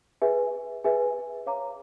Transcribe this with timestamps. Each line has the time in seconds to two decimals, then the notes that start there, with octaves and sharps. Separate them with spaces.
0.22 G#4 B4 E5 G#5
0.84 G#4 B4 E5 G#5
1.46 C#5 F5 A#5 D6